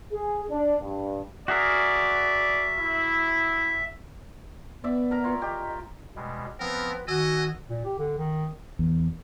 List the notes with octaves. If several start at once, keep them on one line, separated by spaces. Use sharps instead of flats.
G#4
D4
G2
F#4 G#4 A#4 D5 E5
E4
B3 D5 E5
A#4 A#5
F4 C#5
G4 D#5
B2 G3 G#3
F3 B3 C4 A#4 B4
D#3 F#4 D#5 G#5 E6
A#2
G4
D3
D#3
E2